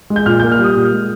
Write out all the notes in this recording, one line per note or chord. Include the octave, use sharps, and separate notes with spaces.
G#3
G6
A#2 F6
G6
A#3
F6
G3
D#6
A#2
G#3